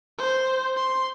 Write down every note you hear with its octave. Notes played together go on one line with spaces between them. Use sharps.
C5
C6